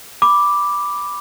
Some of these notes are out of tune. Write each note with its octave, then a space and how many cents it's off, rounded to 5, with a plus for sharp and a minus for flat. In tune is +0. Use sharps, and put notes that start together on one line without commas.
B5 +0 D6 +0